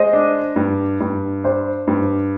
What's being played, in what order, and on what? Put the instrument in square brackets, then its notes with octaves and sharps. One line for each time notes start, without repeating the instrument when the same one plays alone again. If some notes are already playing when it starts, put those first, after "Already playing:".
Already playing: [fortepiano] G#3 [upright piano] C5 D#5
[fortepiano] D4
G2
G2
[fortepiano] D4 [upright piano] C5
[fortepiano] G2